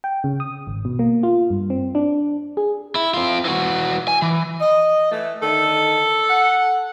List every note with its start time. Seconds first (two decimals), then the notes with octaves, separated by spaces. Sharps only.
0.04 G5
0.24 C#3
0.40 D#6
0.67 G#1
0.85 B2
0.99 A#3
1.23 F4
1.50 G2
1.70 C4
1.95 D4
2.57 G#4
2.95 E4
3.14 C4 F4
3.45 E3 F#4
4.08 G#5
4.22 E3
4.61 D#5
5.11 E3 A3
5.42 D3 D#3 A4
6.30 F#5